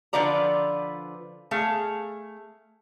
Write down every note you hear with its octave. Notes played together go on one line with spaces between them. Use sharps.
D3 F3 F4 B4 D5 A#5
A3 G#4 F5